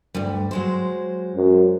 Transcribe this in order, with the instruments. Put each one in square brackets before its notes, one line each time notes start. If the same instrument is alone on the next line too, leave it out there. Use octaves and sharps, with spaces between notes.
[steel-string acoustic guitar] D2 G2 G3
F#3 G#3 C5
[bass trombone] F#2